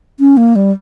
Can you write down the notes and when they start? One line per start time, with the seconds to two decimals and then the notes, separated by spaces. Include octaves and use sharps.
0.19 C#4
0.37 A#3
0.56 G3